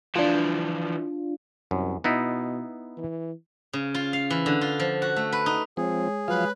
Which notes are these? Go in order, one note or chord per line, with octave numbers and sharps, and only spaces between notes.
E3 F3 D4 F4
C2 F#2
B2 B3 D#4 E4
E3
C#3
F4
F5
E3
D3
F4
F3
F#4
A3
B4
D#4
F3 G#3 C4 G#4 C#5
F3 F#3 B4 F5